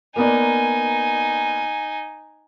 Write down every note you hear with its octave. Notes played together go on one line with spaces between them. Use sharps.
A#3 B3 D#4 D5 G#5